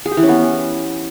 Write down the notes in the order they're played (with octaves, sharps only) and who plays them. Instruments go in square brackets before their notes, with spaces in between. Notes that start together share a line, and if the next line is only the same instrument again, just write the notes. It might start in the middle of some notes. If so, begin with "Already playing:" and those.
[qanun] G#4
G4
E3
C#4
B3